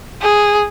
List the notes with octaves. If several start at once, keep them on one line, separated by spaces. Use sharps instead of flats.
G#4